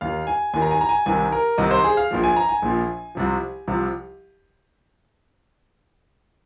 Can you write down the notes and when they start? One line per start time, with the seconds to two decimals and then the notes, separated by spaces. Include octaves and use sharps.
0.01 D#2 D#3 F5
0.27 G#5
0.53 D#2 D#3 G#5
0.62 A#5
0.71 G#5
0.81 A#5
0.89 G#5
1.06 C2 C3 D#3 G#5
1.32 A#4
1.58 C2 C3 D#3 D#5
1.71 C5
1.84 G#4
1.97 F5
2.11 A#1 A#2 F3
2.24 G#5
2.36 A#5
2.49 G#5
2.62 A#1 A#2 F3
3.15 C2 C3 F3
3.68 C2 C3 F3